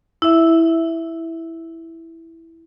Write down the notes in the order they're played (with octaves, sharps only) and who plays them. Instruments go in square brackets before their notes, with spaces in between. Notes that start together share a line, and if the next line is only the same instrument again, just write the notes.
[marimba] E4 E5